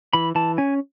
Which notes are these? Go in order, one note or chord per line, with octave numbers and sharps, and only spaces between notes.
E3 B5
E3 A5
C#4 G#5